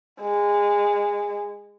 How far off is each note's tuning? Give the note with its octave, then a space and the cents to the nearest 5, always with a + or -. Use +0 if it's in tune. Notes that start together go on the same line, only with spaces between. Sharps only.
G#3 -20